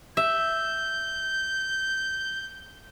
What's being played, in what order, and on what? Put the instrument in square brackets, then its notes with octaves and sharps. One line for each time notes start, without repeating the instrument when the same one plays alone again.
[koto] E5 [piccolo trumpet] G6